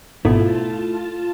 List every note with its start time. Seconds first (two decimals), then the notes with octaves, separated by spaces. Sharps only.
0.25 G#1 B2 A3 E4 F4 A5